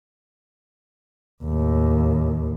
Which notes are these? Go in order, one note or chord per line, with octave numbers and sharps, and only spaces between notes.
D#2 A2